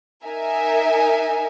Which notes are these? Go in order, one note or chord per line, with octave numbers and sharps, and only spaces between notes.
D#4 A#4 E5 G#5